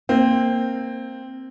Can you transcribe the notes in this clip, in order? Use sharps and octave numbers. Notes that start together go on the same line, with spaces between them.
A#3 C4